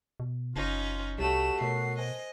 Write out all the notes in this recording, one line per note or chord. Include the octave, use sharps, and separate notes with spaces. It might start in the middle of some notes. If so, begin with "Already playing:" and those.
B2
F#1 C#4 D#4 F4
C2 A3 F#4 G4 C#5 E7
B2 A3 A#4 C#5 C7
C5 D#5 G#5